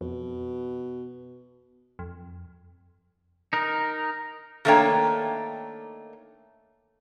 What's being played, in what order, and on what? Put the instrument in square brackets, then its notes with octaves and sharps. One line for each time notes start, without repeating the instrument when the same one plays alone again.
[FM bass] F2 [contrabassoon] B2
[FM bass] F2
[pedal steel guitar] D#4 A#4
[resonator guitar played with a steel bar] D#3 A3 A#3 D4 C#5 G5